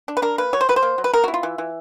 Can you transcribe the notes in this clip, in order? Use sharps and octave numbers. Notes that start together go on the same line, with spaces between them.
D4
B4
D4 A#4
A#3 B4
F#3 C#5
C5
F#3 B4
C5
A#3
F#3
B4
B3 A#4
E4 F#4
F4
E3
E3